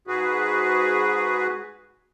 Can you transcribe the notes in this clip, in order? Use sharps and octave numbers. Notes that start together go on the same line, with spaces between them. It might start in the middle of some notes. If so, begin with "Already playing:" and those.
G#2 F#4 G#4 B4